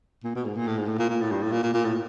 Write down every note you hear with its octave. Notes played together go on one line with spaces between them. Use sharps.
A#2
B2
G#2
A#2
A2
G#2
A2
A#2
A#2
A2
G2
A2
A#2
A#2
A#2
A2